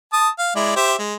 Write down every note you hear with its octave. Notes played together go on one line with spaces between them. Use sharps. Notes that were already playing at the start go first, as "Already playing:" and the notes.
A5 D#6
F5
G#3 E4 D5
G4 C5 E5
G#3